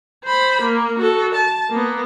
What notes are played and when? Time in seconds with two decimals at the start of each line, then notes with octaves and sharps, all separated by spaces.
0.24 C5 B5
0.62 A#3
1.00 F#4 A4
1.35 A5
1.70 A#3 B3